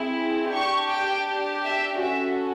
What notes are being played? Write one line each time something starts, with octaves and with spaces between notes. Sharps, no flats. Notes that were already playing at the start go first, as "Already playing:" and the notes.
Already playing: C4 E4 G#4
D4 G4 C#6
G5
E5
C#4 F#4 A4 E5